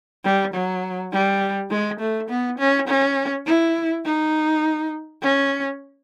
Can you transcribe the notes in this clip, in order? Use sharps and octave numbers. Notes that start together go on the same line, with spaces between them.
G3
F#3
G3
G#3
A3
B3
C#4
C#4
E4
D#4
C#4